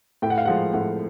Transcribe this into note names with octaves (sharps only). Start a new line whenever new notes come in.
A2 G5
F#5
F5
F3 G#3 F#5
A2 F#5